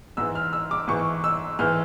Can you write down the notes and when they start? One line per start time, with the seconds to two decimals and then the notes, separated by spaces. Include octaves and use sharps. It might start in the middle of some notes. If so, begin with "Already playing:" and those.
0.17 G#2 E3 E6
0.35 F6
0.53 E6
0.71 D6
0.88 G#2 E3 C#6
1.24 E6
1.59 G#2 E3 F6